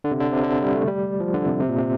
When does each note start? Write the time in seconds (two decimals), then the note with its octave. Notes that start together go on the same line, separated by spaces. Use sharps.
0.04 D3
0.11 C3
0.20 D3
0.32 C3
0.44 D3
0.62 G3
0.75 A3
0.88 G3
1.20 F3
1.34 D3
1.46 C3
1.60 C3
1.69 A#2
1.78 C3